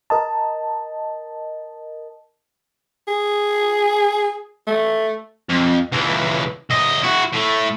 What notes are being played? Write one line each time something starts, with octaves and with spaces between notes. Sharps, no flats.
A#4 D#5 A5
G#4
A3
F2
C#2 E3
D2 D#5
E4 F#4
A2 A3